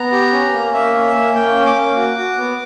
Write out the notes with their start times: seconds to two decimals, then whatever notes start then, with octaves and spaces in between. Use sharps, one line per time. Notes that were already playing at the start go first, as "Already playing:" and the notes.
Already playing: B3 A#5
0.12 G4
0.33 C#4
0.53 A#3
0.73 A#3 E5
0.94 C#4
1.15 A#3
1.35 A#3 G5
1.55 C#4
1.66 D6
1.76 A#3
1.96 F#4
2.17 F#4
2.37 B3